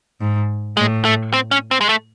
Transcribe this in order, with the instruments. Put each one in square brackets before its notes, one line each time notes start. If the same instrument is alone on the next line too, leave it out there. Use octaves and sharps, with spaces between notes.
[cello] G#2
[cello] A2 [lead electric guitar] G#3
[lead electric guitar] A3
C4
C#4
C4
G#3
A3